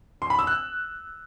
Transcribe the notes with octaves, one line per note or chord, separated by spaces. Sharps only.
C6
B5
E6
F#6